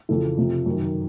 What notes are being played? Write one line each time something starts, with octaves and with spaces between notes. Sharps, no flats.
F2 C#3 E3 A4
F2 C3 F3
F#2 D#3